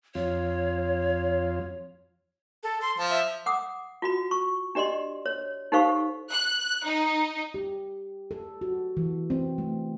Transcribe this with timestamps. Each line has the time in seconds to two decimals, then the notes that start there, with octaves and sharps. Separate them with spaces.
0.15 F2 F4 C#5
2.63 A4
2.82 C6
2.98 F3 A5
3.10 E5
3.46 F#5 D6 D#6
4.02 F4 F#4 B5
4.31 C#6
4.75 D4 G4 D5 D#5 C6
5.26 C#5
5.72 D#4 G4 A4 C5 F5 C#6
6.30 F#6
6.85 D#4
7.54 G4
8.31 A4
8.61 F#4
8.97 E3
9.30 C4
9.58 A3